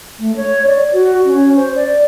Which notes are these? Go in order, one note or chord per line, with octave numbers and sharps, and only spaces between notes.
A3
C#5
D5
F#4
C#4
C5
D5